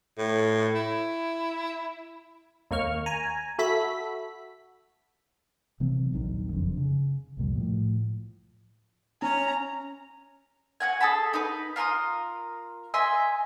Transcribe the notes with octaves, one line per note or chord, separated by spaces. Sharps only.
A2
E4
D#2 A#3 C#6 F6
G#5 A#5
F#4 A4 E5 B5 B6
C3 E3 F#3 C4
A#1 D#2 D#3 F#3
F#1 F2 D4
C#3
C2 F2 A#2 G3
A2 F3
C#4 A#5
F#4 F#5 G#5
G#4 A4 A5 B5
D#4 B4
F4 A#4 C6 D#6
D#5 E5 G#5 C6